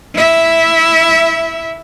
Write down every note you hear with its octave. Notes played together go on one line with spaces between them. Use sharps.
E4 E5